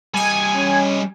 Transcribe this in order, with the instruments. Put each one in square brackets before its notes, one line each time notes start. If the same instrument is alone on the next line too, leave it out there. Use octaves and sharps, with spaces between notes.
[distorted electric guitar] G3 D#5 [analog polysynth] G#5
[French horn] C#4